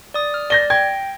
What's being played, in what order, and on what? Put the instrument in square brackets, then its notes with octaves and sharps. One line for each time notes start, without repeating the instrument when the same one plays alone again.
[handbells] D5 D#6
F6
[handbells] D5 [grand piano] G6 A#6 G7
[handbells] G5 [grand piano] G#6